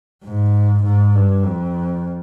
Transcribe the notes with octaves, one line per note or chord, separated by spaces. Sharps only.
G#2
G#2
G2
F2